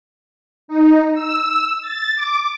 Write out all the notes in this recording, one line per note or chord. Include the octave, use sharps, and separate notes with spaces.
D#4
E6
A6
D6